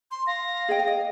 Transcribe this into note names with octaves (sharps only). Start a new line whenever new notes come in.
C6
F5 A#6
G#4 D#5 G5
D#5